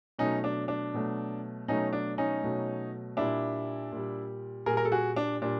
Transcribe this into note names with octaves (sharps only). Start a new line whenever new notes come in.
B2 F#3 A3 C#4 D#4
D4
D4
B2 F#3 A3
B2 F#3 A3 C#4 D#4
D4
C#4 D#4
B2 F#3 A3
A#2 G3 D4 E4
A#2 G3
A#2 G3 G#4 A#4
A#4
A4
F#4 G#4
D4
A#2 G3 D4